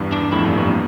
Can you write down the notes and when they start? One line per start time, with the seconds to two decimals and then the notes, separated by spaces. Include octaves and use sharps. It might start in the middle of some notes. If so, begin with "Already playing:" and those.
Already playing: E2 G2
0.12 D4
0.22 G2
0.32 F2 A2 E4
0.45 E2 G2
0.51 A#3
0.57 E2 G2